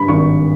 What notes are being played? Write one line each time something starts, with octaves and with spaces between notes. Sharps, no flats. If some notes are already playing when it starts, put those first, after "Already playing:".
Already playing: G2 C#3 B5
G#1 C#6